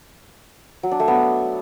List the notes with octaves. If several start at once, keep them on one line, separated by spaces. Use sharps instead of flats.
F#3
D4
A3
B3